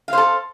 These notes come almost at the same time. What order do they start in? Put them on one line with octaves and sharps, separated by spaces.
F5 C5 A4